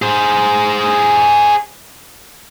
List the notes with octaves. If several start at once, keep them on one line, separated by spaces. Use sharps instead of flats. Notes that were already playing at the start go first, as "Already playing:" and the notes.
G#4 C5